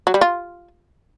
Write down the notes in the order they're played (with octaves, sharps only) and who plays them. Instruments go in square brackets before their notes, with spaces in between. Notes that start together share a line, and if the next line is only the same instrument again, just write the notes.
[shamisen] F#3
G3
F4